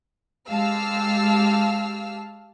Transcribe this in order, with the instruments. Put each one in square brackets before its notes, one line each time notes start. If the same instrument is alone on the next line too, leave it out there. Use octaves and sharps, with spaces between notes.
[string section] G#3 G4 F5 A5 E6 F6